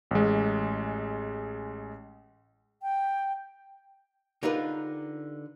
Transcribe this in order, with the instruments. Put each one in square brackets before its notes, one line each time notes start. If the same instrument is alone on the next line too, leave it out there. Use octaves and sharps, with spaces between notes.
[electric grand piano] A1 G#3
[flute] G5
[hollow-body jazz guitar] D3 D#4 F4 G4 A#4 B4